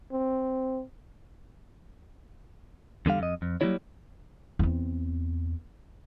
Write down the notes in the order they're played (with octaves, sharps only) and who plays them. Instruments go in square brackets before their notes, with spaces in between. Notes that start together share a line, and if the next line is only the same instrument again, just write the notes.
[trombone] C4
[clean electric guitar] E2 D3 G3 F5
F2 D#5
F2
F#3 G3 A3 A#3 E4 C#5
[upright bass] E2 C4